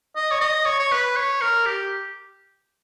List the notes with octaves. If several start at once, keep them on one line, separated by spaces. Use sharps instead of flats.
D#5
C#5
D#5
C#5
C#5
B4
C#5
A#4
G4